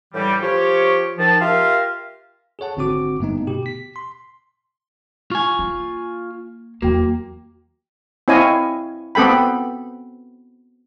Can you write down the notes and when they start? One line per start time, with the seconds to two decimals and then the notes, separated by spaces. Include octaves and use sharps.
0.14 A2 D3 E3 G3
0.41 F3 G4 C#5
1.18 D#3 F3 A5
1.40 F4 G4 A#4 E5 F5
2.59 G#4 A4 C#5 F#5 A5
2.77 G#1 D3 C4 F#4 D6
3.20 G2 D3 A3 B3 D#4
3.47 B2 G4
3.66 B6
3.96 C6
5.31 F4 G#5 C#6
5.59 A#3
6.82 E2 F#3 A#3 F#4 G5
8.28 C4 E4 C#5 D#5 F5 G#5
9.15 B3 C4 A4 G5 B5